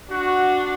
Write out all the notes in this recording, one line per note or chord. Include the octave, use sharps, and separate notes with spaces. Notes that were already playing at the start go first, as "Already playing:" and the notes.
D4 F#4